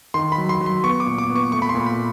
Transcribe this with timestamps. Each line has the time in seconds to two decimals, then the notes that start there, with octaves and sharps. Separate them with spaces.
0.14 D#3 C6
0.32 B5
0.38 F#3
0.49 C6
0.61 F#3
0.66 C6
0.84 B3 C#6
1.00 D6
1.06 A#2
1.18 D6
1.30 B3
1.36 C#6
1.52 A3 C#6
1.62 B5
1.69 C6
1.75 A#2
1.86 B5